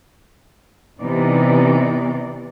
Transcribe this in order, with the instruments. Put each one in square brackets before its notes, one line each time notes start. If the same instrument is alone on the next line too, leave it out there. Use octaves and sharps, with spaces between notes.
[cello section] C3 E3 B3 D#4 D5